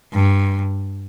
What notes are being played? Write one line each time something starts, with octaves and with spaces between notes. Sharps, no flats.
G2